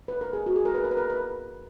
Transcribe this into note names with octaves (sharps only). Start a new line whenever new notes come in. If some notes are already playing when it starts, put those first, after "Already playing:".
B4
A#4
G#4
F#4
G#4
A#4
B4
A#4
B4
A#4
B4